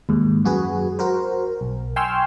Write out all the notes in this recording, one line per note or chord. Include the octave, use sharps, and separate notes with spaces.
D#2 G#2
F#2 F#4 G#4 B4
F#4 A#4 C5
B1
G5 G#5 C6 C#6 E6 F6